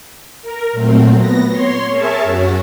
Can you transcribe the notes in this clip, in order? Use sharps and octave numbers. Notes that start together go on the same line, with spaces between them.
A#4
A#2 F#3 A3 C4
B3 A#6
C#5 C6
G#4 A#4 C#5 E5 A5
F#2 C#4 F#4